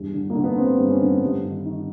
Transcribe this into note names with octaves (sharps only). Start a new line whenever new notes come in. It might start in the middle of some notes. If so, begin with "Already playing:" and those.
Already playing: E2 G2
D3
A#3
D3
B3
G2 C4
G2
C#4
D3
G2
D#3
D#3